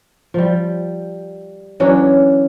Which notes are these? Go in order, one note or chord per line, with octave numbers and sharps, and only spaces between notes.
F3 G3
E3 F#3 C#4 D4